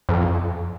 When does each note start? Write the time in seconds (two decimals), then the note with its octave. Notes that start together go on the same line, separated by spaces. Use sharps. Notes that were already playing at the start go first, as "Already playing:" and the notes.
0.09 F2